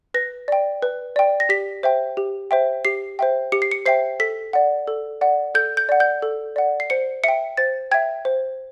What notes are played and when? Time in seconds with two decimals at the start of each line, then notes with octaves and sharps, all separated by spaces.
0.14 B4 A#6
0.48 D5 G5
0.82 B4
1.16 D5 G5
1.40 A#6
1.49 G4 B6
1.83 C5 E5 G5
2.17 G4
2.51 C5 E5 G5
2.85 G4 C7
3.19 C5 E5 G5
3.52 G4 C#7
3.62 C7
3.71 C#7
3.86 C5 E5 G5 C7
4.20 A4 B6
4.53 D5 F#5
4.87 A4
5.21 D5 F#5
5.55 A4 G6
5.77 G6
5.89 D5 F#5
6.00 G6
6.22 A4
6.56 D5 F#5
6.80 C7
6.90 C5 C#7
7.24 E5 G5 C#7
7.57 C5 A6
7.91 E5 G5 G#6
8.25 C5